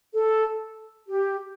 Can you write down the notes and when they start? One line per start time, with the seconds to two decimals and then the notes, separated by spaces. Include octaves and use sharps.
0.15 A4
1.09 G4